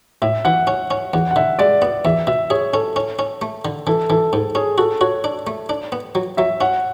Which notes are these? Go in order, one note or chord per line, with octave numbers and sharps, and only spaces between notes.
A2 E5
E3 F#5
C#4
C#4
E2 F#5
F#5
D3 E5
G#3 D5
B3 D5
E2 E5
B2 E5
G#4 C#5
C#4 A4
C#4
C#4
A3
D3
E3 A4
E3 A4
G#2 A4
C#4 G#4
F#4 A4
F#4 C#5
D4
A3
D4
B3
F#3
F#3 E5
C#4 F#5